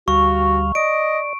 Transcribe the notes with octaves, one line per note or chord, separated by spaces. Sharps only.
D2 G3 F#4 F5 C#6
D5 D#5 D7